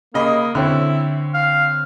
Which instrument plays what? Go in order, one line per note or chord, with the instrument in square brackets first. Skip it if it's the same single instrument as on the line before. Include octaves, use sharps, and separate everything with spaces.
[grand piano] C#3 D#5 B5 [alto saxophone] A#3
[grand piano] D3 C4 C#4 [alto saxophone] E4
[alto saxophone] F5